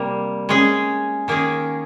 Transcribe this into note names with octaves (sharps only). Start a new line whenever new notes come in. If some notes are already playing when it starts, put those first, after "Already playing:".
Already playing: C3 G3 A#3
G#3 C#4 G#4
D#3 A#3 C#4 G#4